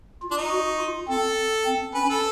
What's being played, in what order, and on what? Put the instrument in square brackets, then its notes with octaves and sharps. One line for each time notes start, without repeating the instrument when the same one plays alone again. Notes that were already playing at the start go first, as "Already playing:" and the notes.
[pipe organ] F4
[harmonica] D4
D#4
[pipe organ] F#4
F4
[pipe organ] C4 [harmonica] A4
[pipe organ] C4
[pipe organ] C#4 [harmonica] B4
[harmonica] A4